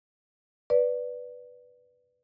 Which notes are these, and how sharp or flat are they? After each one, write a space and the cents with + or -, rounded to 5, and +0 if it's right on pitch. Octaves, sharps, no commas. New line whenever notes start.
B4 +0 D5 +0